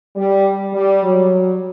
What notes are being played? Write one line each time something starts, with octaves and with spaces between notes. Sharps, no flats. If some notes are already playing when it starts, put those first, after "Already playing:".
G3
G3
F#3